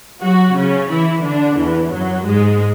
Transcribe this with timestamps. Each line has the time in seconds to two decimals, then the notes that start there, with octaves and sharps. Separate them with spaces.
0.22 F#3 F#4
0.55 C#3 C#4
0.89 E3 E4
1.23 D3 D4
1.57 E2 E3
1.91 F#2 F#3
2.25 G#2 G#3